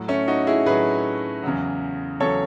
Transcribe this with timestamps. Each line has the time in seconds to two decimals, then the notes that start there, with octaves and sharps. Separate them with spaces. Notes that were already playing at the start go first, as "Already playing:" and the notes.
Already playing: A2 F#3
0.08 A3 C#4
0.28 D#4 F#4
0.47 E4 G#4
0.66 A2 F#3 G#4 B4
1.43 E2 C#3 F#3
2.20 E2 C#3 F#3 A4 C#5